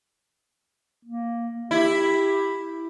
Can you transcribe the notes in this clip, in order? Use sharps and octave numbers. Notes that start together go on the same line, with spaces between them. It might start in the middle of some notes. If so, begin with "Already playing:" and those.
A#3
E4 G4